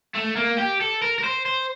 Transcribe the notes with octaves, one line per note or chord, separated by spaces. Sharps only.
A3
A#3
G4
A4
A#4
A#4
C5
C5